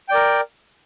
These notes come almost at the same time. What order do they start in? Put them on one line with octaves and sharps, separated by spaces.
G5 D5 A#4